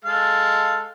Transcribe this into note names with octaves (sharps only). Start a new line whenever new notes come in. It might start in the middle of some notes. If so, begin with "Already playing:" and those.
G#3 A4 F5